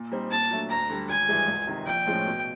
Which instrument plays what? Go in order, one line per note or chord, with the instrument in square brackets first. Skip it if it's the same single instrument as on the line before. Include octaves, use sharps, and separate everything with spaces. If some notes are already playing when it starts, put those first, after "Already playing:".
Already playing: [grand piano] A#2
G3 C4 D#4
[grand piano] A#2 [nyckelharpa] A5
[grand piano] F#3 A3 D4
[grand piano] D2 [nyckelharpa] A#5
[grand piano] D3 G3
[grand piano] G#1 [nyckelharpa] G#5
[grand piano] G2 E3 G#3
C#2
C3 D#3
[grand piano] A#1 [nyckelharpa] G5
[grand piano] A2 F3 G#3 C#4
B2